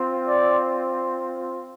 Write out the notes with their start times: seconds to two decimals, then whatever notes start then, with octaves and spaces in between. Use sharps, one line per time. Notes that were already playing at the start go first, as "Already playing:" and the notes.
Already playing: C4 F4
0.25 D5